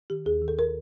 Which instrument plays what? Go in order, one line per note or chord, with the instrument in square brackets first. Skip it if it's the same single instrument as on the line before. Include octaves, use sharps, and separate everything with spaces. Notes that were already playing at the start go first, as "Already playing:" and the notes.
[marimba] D#3 G4
D#2 G#4
D#3
A4
A#4